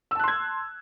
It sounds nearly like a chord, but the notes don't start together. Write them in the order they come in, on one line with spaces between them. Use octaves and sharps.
E6 A5 F#6 C6 G#6